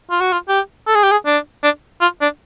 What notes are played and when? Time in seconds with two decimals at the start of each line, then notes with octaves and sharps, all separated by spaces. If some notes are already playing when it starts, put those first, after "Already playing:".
0.11 F4
0.20 F#4
0.32 F4
0.48 G4
0.87 A4
0.95 G#4
1.03 G4
1.12 G#4
1.26 D4
1.63 D4
2.01 F4
2.21 D4